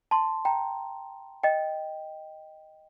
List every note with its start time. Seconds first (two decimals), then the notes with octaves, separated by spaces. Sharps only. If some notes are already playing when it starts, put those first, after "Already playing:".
0.11 A5 C6
0.45 G5 A#5
1.43 D#5 G5